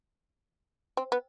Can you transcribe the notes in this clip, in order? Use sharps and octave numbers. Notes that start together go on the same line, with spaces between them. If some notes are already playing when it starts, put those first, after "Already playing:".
C4
B3